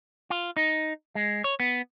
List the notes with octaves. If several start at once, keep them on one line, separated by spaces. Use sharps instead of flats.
F4
D#4
G#3
C#5
B3